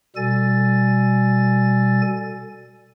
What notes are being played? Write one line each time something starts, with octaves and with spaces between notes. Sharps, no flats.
B2 G3 A4 G#5 A6